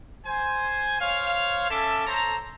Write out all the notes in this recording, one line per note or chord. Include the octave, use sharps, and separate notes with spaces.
C5 G#5
C5 C#5 F5
C#4 A4 E5 A5 D6
A4 C5 C#5 A#5